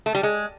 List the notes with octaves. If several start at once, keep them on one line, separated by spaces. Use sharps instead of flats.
A3
G3
G#3